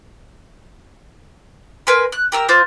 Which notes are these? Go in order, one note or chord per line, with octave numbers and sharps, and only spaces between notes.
A#4 B4 G#5 C6
F#6
G4 A#4 E6
F4 C5 D6 G6